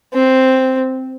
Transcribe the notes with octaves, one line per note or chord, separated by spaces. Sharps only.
C4